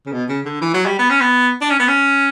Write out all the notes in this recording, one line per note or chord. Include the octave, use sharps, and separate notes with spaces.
C#3
B2
C#3
D3
E3
F#3
G3
B3
C#4
B3
D4
C#4
B3
C#4